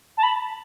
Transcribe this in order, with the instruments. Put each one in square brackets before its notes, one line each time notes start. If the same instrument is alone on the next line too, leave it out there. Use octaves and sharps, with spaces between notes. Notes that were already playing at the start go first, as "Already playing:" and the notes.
[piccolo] A5
B5